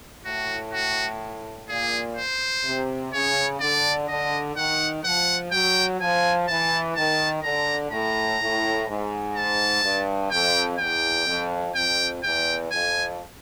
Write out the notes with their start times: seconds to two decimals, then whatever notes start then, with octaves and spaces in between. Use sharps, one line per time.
0.24 A2 F#4
0.73 F#4
1.69 A#2 G#4
2.16 C5
2.64 C3
3.13 C#3 C#5
3.60 D3 D5
4.08 D3 D#5
4.56 D#3 F#5
5.04 F3 F#5
5.52 F#3 G5
6.00 F3 G#5
6.48 E3 A5
6.96 D#3 A5
7.43 D3 A#5
7.91 A2 A#5
8.40 A2
8.88 G#2
9.35 A5
9.84 G2
10.31 F2 G5
10.79 E2 G5
11.27 F2
11.75 F2 G5
12.23 E2 G5
12.71 F2 G#5